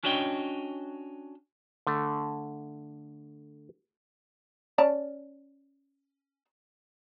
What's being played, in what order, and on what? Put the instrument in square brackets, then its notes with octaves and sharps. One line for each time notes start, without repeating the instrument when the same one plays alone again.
[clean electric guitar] C#4 D4 F#4 C#5 D#5 G5
[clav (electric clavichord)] D3 A3
[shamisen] C#4 D5 A5